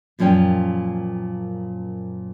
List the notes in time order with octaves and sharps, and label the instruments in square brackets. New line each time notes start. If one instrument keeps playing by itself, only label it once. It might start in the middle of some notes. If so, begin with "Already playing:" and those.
[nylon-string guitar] F#2 A#2 F3 C#4 G5